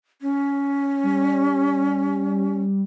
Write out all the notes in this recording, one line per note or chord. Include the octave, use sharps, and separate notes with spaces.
C#4
G3